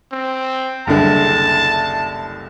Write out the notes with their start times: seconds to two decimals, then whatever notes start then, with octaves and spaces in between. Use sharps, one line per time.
0.12 C4
0.87 F#1 C2 D3 A5